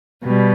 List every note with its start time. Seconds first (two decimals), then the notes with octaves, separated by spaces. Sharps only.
0.24 B2 G3